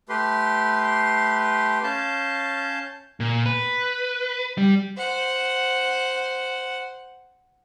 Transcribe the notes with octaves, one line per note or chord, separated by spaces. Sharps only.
A3 G4 B4 C6
C#4 F5 A5 G6
A#2
B4
G3
C5 F#5